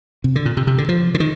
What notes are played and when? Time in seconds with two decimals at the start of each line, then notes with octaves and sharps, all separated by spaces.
0.24 C3
0.36 D3
0.46 A#2
0.57 C3
0.67 C3
0.78 D3
0.89 F3
1.14 D3
1.20 D#3